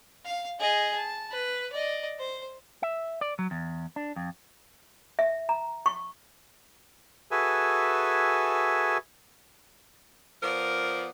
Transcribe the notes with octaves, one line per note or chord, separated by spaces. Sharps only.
F5
G#4 D#5
A5
B4
D5 D#5
C5
E5
D5
F#3
E2
D4
F2
E5
A#5
C#6
F#4 G#4 A4 B4 E5 G#5
F3 B3 A#4 D5 F5